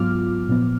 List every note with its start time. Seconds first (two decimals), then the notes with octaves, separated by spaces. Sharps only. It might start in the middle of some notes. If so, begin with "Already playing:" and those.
Already playing: G#2 F#3 B3 F4 D6 F6
0.49 A#2 F3 B3